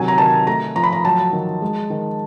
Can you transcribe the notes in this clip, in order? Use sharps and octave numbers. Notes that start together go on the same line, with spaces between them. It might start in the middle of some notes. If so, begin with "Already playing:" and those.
Already playing: C3 D#3 F#3 G#5
A#5
D#3 A5
A3 A#5
F3 A#5
B5
A#5
F#3 A5
D#3
G#3
D#3